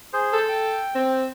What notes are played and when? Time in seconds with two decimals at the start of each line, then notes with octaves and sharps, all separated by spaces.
0.13 G#4 C5
0.33 A4
0.49 G5
0.95 C4